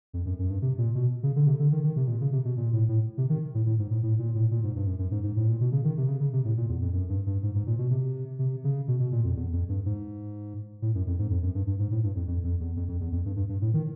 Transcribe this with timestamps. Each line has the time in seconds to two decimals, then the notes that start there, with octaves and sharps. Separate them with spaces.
0.14 F2
0.25 F#2
0.39 F#2
0.50 G2
0.62 C3
0.78 A#2
0.95 B2
1.23 C#3
1.36 D3
1.47 C3
1.59 D3
1.72 D#3
1.84 D#3
1.96 C3
2.08 A#2
2.21 C#3
2.32 C3
2.45 B2
2.57 A#2
2.73 A2
2.89 A2
3.18 C3
3.30 D#3
3.54 A2
3.66 A2
3.79 G#2
3.91 A2
4.03 A2
4.19 A#2
4.35 A2
4.51 A#2
4.63 G#2
4.76 G2
4.87 F#2
4.99 F#2
5.11 G#2
5.24 G#2
5.36 A2
5.48 A#2
5.61 B2
5.72 C#3
5.84 D#3
5.97 C3
6.08 C#3
6.20 C#3
6.33 C3
6.45 A2
6.57 A#2
6.69 E2
6.82 F2
6.93 F#2
7.09 G2
7.26 G2
7.43 G#2
7.55 G#2
7.67 A#2
7.79 B2
7.90 C3
8.39 C3
8.64 C#3
8.88 B2
9.00 B2
9.12 A#2
9.24 F2
9.36 E2
9.52 F2
9.69 G2
9.86 G#2
10.82 A2
10.95 F#2
11.07 F2
11.19 G#2
11.30 F2
11.42 F#2
11.55 G2
11.67 G2
11.79 G#2
11.91 A2
12.03 G2
12.16 F2
12.27 F2
12.44 F2
12.60 E2
12.76 F2
12.88 F2
13.00 E2
13.12 F2
13.25 G2
13.36 G2
13.49 G2
13.62 A2
13.74 D#3